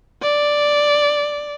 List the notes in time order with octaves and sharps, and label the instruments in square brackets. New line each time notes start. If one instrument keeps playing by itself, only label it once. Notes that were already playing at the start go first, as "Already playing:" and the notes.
[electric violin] D5